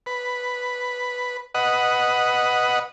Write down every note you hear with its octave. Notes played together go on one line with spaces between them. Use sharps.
B4
B4 D#5 F#5